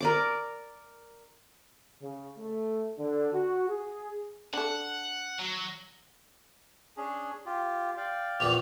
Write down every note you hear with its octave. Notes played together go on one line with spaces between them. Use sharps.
A#4 D5 D6
C#3
A3
D3
F#4
G#4
D4 A4 F#5
F#3
C#4 D4 G#4
F4 G4
D5 F5 G5
A#1 E2 G3 F7